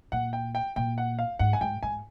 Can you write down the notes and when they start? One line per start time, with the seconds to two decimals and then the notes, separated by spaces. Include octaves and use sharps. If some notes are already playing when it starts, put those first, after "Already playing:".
0.12 A#2 F#5
0.33 G5
0.55 G5
0.76 A#2 G5
0.98 F#5
1.19 F5
1.39 G#2 F#5
1.53 G#5
1.61 G#2 G5
1.83 G#2 G#5